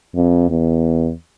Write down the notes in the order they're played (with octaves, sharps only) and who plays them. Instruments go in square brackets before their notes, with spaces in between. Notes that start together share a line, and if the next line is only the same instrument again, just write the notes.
[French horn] F2
E2